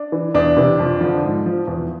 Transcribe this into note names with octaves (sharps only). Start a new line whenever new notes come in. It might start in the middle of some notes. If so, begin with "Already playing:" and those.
Already playing: D4
E3
E2 D4
C3 E3
F2
D3 F3
G#2
F3
E2